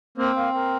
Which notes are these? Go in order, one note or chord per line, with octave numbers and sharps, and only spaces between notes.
A#3 C4
A#3
A#3